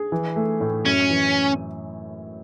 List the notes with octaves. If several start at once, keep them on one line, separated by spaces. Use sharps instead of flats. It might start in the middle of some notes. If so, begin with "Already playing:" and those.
Already playing: G#4
E3
A3
A2
F#2 C#4
E3